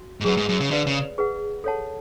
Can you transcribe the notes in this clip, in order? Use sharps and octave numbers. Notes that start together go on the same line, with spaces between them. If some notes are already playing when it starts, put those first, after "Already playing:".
Already playing: F#4
G#2
F#2 G#4 B4 F#5
G#2
F#2
C#3
D3 B4 D5 F5
C#3
G#4 B4 F#5
A4 C#5 F#5 A5